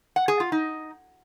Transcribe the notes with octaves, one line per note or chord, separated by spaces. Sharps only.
F#5
G#4
F4
D#4